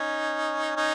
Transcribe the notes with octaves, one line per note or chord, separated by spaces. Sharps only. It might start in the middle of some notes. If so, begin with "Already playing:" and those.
Already playing: C#4 D#4
C#4 D#4